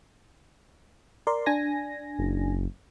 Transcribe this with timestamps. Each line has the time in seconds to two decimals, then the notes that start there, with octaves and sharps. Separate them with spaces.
1.27 A#4 D5 C6
1.46 D4 G#5 A#6
2.19 F#1